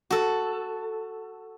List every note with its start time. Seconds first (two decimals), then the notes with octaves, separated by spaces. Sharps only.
0.10 F#4 A4